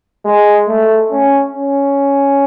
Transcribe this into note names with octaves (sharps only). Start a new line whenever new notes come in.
G#3
A3
C#4
C#4